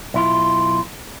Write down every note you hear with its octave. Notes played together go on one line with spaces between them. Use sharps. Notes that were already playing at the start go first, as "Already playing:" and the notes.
B1 E4 F4